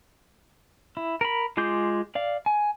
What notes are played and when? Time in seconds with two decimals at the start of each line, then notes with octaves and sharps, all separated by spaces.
0.97 E4
1.21 A#4 B5
1.57 G#3 F4 G#4 D6 G6
2.15 D5 F5
2.46 G#5